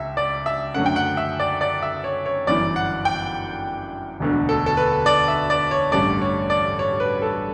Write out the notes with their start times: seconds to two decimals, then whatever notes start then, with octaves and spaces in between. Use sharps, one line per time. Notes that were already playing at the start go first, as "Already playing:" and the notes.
Already playing: C#2 E5
0.17 D5
0.46 E5
0.74 F#2 D3 A3 C#4 F#5
0.86 G5
0.96 F#5
1.17 E5
1.40 D5
1.61 D5
1.82 E5
2.04 C#5
2.26 C#5
2.47 G1 F#2 E3 D5
2.76 F#5
3.05 G5
4.20 E1 D2 D3
4.49 A4
4.66 A4
4.77 B4
5.06 D5
5.28 E5
5.50 D5
5.71 C#5
5.92 A1 G2 D3 A3 C#4 D5
6.22 C#5
6.50 D5
6.79 C#5
7.00 B4
7.22 A4